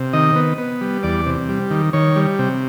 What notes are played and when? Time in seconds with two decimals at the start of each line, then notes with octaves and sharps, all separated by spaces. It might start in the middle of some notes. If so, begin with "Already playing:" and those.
Already playing: C3
0.13 D#3 D#5
0.35 B3
0.58 B3
0.81 G3
1.03 E2 D5
1.26 C3
1.49 G3
1.71 D#3
1.93 D#3 C#5
2.16 G3
2.39 C3